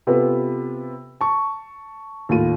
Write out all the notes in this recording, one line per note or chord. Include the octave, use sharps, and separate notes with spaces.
C3 B3 F4 A4 B4
A5 C#6
D#2 A2 F4 D#7